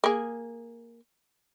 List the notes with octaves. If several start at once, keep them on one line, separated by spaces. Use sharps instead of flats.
A#3 G#4